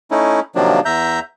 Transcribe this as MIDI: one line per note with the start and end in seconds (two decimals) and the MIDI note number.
0.11 0.40 57
0.11 0.40 61
0.11 0.40 63
0.11 0.40 64
0.55 0.80 48
0.55 0.80 51
0.55 0.80 53
0.55 0.80 54
0.55 0.80 58
0.55 0.80 62
0.85 1.20 40
0.85 1.20 76
0.85 1.20 82
0.85 1.20 91